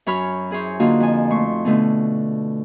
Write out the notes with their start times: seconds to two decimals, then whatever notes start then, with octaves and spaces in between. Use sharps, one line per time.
0.06 F#2 C#5 B5 F6
0.51 E4 G#4 C5 C#5
0.80 D3 A#3 D#4 F4 F#4
1.00 F2 G#5
1.30 A3 C6 C#6
1.65 B2 D3 A3